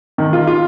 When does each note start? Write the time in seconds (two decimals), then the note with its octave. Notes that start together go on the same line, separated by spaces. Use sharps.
0.18 D#3
0.33 F4
0.47 F4